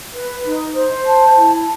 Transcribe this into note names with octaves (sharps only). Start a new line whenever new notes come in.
B4
D#4
C5
A5
E4